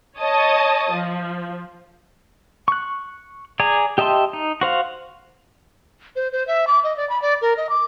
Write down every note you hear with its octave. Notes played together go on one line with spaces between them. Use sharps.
C#5 D#5 A5 D#6
F3
C#6 F#6
G#4 D5 G#5 A#5
G4 D#5 E5 A5 C6
D#4
F#4 C5 F5
C5
C5
E5
D6
D#5
D5
B5
D5
A#4
D#5
D6